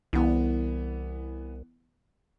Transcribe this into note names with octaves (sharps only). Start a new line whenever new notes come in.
C2 E3 B3